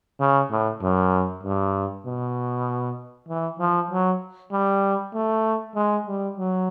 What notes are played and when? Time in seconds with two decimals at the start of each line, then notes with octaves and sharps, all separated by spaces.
0.20 C#3
0.51 A2
0.81 F#2
1.43 G2
2.06 B2
3.29 E3
3.59 F3
3.91 F#3
4.52 G3
5.14 A3
5.75 G#3
6.07 G3
6.37 F#3